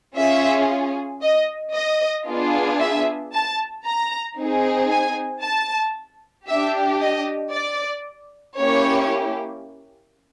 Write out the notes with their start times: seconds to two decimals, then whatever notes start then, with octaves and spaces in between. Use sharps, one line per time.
0.16 C#4 F4 G#4 E5
1.22 D#5
1.75 D#5
2.27 B3 D4 F4 G#4
2.80 E5
3.33 A5
3.85 A#5
4.37 C4 D#4 G#4
4.90 G#5
5.42 A5
6.47 D4 G4 E5
7.01 D#5
7.53 D5
8.58 A#3 C#4 E4 G4 C#5